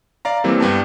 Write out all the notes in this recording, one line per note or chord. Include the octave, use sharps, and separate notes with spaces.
D5 F5 A#5
E3 G3 A#3 C4
G2 G3 B3 A5